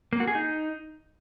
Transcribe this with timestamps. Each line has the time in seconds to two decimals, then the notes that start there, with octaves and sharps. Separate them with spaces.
0.13 A#3
0.20 F#4
0.28 G#4
0.35 D#4